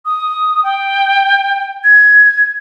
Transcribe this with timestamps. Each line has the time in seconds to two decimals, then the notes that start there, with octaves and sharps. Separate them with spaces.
0.05 D#6
0.64 G5
1.84 G#6